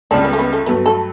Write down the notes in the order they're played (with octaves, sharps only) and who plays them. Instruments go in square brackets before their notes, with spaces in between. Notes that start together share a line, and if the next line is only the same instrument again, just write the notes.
[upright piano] C#2 C#3 G3 [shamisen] D4
[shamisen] B3
A3
B3
A3
[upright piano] G2 F#3 A3 [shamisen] B3
[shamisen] A4